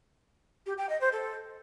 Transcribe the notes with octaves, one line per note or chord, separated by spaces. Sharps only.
G4
G5
D#5
C5
A4